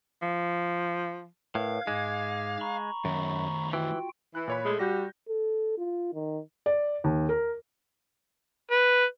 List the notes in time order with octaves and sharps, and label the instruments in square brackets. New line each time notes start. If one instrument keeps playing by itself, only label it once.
[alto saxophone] F3
[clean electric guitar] A2 [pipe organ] A#4 B4 C#5 [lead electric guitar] F5
[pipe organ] G#2 D6 G#6 [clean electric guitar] G#3
[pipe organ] A#5 B5 C#6
[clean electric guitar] F#2 [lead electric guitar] D#3 A3
[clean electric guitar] E3 [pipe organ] F4 F#4 G5
[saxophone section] E3 [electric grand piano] F#6
[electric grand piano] A#2 C#5 B5
[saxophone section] G#3 A3
[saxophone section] G3 F#4 [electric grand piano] G6 A#6
[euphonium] A4
F4
D#3
[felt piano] D5
D#2
A#4
[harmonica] B4